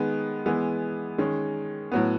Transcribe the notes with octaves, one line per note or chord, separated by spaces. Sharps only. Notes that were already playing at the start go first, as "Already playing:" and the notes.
Already playing: D#3 G#3 B3
E3 G#3 B3
D#3 G#3 C#4
A2 F#3 B3